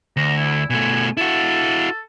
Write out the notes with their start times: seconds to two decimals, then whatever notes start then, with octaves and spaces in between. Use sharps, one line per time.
0.17 D2 A#5
0.37 E4
0.70 B2 A3 G#5
1.17 E4 F#4 A4